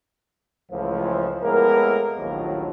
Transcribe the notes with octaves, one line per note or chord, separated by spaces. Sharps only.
C#2 A2 E3 F3
A2 G#3 A#3 B3 A#4
A#1 D#2 A2 D#3 F3 F#3